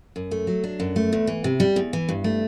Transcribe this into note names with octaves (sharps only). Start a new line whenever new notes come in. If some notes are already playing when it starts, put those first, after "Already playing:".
F#2
A3
F#3
D4
F#2
A3
E2
E3
C3
G3
E2
E3
G2
A3